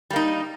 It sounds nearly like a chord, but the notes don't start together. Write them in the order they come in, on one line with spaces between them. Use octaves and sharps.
G3 A#3 D#4